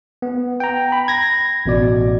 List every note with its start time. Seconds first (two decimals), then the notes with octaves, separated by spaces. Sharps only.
0.22 B3
0.60 G5 A#5
0.92 B5
1.08 G#6 A#6
1.66 A1 B2 D5